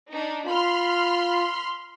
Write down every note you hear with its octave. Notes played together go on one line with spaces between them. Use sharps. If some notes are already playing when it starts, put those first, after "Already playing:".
D4 D#4
F4 B5 C6 F6